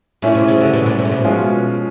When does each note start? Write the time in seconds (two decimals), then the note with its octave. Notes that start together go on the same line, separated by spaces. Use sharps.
0.22 A#2 A3 C#4 E4
0.35 C3
0.48 C#3
0.61 D3
0.74 B2
0.86 A#2
0.99 C3
1.05 A#2
1.12 B2
1.24 F3 G#3 C#4 F4